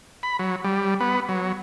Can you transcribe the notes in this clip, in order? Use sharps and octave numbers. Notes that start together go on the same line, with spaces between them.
B5
F#3
G3
B3
F#3